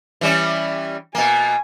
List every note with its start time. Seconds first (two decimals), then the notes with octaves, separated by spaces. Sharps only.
0.21 E3 G3 C#4
1.15 B2 A#3 G#5